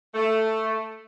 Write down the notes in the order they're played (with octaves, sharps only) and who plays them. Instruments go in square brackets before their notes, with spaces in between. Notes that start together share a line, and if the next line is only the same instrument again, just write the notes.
[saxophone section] A3